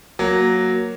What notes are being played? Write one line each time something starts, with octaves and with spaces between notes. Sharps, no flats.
F#3 A#3